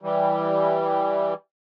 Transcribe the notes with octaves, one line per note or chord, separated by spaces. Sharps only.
E3 G3